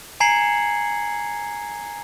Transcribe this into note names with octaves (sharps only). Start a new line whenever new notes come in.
G#5 A#5 G#6 C7 C#7 F#7